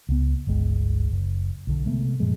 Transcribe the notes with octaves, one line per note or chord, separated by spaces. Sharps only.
C#2 B3
G1 C#2 G#3
F#1
B1 D3
C3 G#3 A3 B3
F#2 A#2 F3 G#3